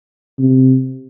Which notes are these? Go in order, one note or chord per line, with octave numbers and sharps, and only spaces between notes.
C3